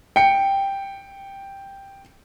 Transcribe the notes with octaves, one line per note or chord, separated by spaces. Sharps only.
G5 C#7